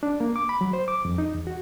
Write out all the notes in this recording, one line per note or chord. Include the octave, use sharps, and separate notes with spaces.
D4
A#3
D6
B5
F#3
C5
D6
F2
D#4
E2
F#4